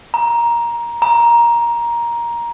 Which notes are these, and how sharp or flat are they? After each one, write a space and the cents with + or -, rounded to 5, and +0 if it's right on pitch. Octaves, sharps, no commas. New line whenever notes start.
A#5 +15
A#5 +15